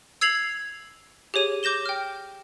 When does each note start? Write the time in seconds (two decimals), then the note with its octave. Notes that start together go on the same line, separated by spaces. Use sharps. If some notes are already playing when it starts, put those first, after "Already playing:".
0.21 E6 G#6 C7 F7 F#7
1.34 G4 G#4 C#5 D#7
1.63 D6 G6 A#6 E7 G7
1.85 G5 F6